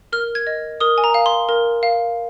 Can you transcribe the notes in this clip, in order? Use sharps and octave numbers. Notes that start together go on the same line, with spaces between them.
A#4 F6
G#6
D#5
A#4 D#6
G#5
A#5
F5
C6
A#4
F5